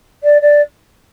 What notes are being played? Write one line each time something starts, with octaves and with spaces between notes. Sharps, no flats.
D5
D5